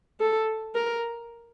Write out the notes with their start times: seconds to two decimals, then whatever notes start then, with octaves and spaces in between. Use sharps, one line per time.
0.20 A4
0.75 A#4